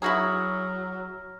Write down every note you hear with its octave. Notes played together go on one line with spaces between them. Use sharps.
F#3 E4 F#4 G#4 A#5 F6 A#6